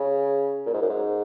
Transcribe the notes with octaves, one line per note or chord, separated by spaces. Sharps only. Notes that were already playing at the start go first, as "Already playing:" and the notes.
Already playing: C#3
A#2
G#2
F#2
G#2